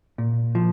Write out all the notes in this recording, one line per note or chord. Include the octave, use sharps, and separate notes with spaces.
A#2
F3